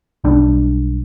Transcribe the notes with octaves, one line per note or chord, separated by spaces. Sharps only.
B1 G3 D4